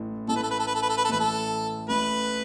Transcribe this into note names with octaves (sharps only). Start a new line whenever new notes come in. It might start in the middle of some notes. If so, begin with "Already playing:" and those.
Already playing: A1 A2 E3 A3
A1 A2 E3 A3 A4
B4
A4
B4
A4
B4
A4
B4
A4
B4
A4
A1 A2 E3 A3 B4
A4
A1 A2 E3 A3 B4